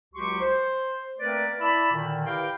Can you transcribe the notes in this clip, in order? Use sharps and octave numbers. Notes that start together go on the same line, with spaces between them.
C#2 F#3 F#4 G4 C6 C#6
C5
A3 A#3 C4 A#4 B4 D5
E4 D5 E5 A5 B5
A#2 D3 D#3
E4 G4 A#4 B4 F5 G5